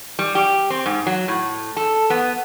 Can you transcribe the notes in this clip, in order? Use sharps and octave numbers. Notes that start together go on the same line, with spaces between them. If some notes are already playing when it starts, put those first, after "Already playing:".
G3
G4
C4
G#2
F#3
A2
A4
B3